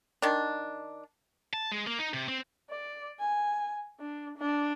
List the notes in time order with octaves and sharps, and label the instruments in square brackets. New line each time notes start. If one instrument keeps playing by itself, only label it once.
[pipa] D#3 D4
[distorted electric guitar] A5
G#3
A#3
D#4
C3
C4
[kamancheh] D5
G#5
D4
D4